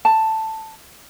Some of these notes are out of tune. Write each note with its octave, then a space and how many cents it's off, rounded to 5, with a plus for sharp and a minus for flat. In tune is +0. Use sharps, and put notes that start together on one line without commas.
A5 +5